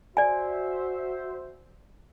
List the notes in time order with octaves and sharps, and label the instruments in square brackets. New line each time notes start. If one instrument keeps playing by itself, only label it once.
[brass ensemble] F#4 C5 E5 [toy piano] D5 G#5